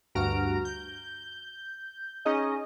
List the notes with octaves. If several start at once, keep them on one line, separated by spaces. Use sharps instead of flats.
D2 G2 F#4 A#5 F6 D7
G6
C#4 D#4 G#4 D#5